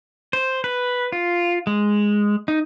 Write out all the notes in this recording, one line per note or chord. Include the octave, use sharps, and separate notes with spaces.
C5
B4
F4
G#3
D#4